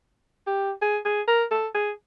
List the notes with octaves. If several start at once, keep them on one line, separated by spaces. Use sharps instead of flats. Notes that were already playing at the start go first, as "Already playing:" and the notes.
G4
G#4
G#4
A#4
A4
G#4